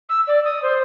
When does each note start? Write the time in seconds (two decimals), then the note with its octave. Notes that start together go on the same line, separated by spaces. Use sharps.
0.09 E6
0.27 D5
0.45 D#6
0.62 C5